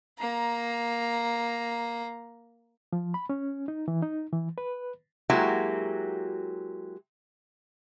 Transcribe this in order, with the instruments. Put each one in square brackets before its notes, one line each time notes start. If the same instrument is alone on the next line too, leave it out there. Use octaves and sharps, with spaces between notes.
[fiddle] A#3 A#5
[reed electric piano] F3
B5
C#4
D#4
E3
D#4
E3
B4
[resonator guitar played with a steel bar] F#3 G#3 A#3 E4 F#4 G4